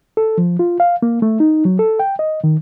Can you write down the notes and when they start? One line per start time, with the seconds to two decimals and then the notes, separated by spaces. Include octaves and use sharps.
0.17 A4
0.38 F3
0.59 F4
0.80 F5
1.02 A#3
1.22 A3
1.40 D#4
1.65 F#3
1.79 A4
1.99 G5
2.19 D#5
2.44 D#3